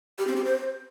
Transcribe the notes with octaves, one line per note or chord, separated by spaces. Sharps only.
G4
C4
G4
C5